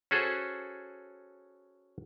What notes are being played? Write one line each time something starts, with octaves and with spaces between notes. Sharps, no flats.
C#4 F#4 G#4 A4 C5